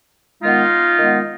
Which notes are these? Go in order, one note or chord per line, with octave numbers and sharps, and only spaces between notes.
D#3 G#3 B3 D#4 F4
D#3 G#3 B3